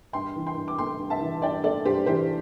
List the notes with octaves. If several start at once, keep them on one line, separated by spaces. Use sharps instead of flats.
G2 G5 C6
E3
G5 C6
G2
D6
A3 G5 C6
G2
E5 A5
E3
G2 D5 G5
A3 A4 D5
G2 G4 C5
E3 G4 C5